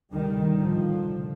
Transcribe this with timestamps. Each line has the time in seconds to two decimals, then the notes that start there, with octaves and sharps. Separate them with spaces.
0.12 D2 C3 D#3 G3
0.58 A#1 A2 D3 F3
1.04 F1